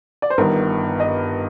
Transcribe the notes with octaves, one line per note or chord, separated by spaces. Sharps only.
D5
C5
G1 G2 D#3 A#4
D#5